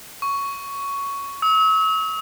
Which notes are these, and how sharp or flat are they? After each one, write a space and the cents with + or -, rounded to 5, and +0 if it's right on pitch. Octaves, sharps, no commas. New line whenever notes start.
C#6 +10
E6 -40